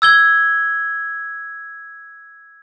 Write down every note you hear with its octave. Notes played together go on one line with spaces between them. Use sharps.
E6 G#6 G7